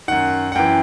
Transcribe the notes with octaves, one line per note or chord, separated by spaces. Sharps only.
F#2 D#3 F#5
F#5
F#2 E3 G5